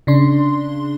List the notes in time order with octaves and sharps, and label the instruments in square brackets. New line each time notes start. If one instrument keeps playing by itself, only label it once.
[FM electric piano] C#3 D4 C6